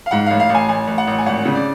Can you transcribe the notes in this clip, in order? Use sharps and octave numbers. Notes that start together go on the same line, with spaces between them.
F5
G#2 F#5
A1 F5
F5
A1
G#5
A1 G#5
A1
F#5
A1
G#5
G#1 F#5
C#3
D5